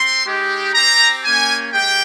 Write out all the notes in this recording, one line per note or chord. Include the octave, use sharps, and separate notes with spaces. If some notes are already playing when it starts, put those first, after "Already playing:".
Already playing: C4 C6
G#3 D#4 G4
C4 G4 A#5
A#3 C#4 G4 G#5
G#3 G4 G5